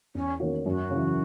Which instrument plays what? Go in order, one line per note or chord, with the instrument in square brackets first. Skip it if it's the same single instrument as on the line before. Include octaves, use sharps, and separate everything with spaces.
[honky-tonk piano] E2 [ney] C#4
[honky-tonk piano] D#3 A#3 C#4 F#4
[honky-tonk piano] F#2 [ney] F#4
[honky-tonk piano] C#3 E3